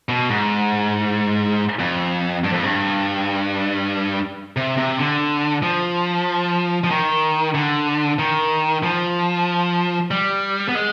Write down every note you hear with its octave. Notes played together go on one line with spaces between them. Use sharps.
B2
G#2
F2
G2
F2
G2
C3
C3
D3
F3
F3
D#3
D3
D#3
F3
G3
B3
G#3